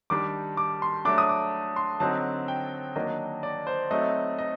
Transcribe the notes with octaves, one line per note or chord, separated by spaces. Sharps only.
D#3 G3 D4 D6
D6
C6
F#3 A3 D4 D6
D#6
D6
C6
D3 F#3 C4 D#4 A5
G5
D#3 F#3 A#3 D4 D#5
D5
C5
F#3 A3 C4 D#4 D#5
D#5